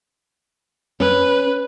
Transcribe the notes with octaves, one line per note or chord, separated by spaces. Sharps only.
C#4 B4